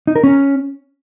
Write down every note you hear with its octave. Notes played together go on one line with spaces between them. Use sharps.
D#4
A#4
C#4